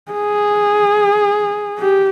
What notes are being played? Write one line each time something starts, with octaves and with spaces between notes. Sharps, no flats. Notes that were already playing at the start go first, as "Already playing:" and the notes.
G#4
G4